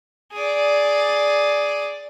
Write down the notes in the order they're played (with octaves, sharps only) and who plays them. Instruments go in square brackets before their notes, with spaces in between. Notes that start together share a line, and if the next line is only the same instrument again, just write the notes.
[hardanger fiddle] G#4 D5